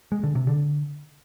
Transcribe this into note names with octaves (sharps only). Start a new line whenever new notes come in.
G#3
D3
C3
D3